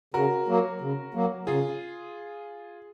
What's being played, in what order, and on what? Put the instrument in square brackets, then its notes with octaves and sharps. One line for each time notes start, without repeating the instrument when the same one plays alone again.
[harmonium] C#3 [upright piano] F#4 A#4
[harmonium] F#3 A#3
C#3
F#3 A#3
[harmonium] C#3 [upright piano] F4 G#4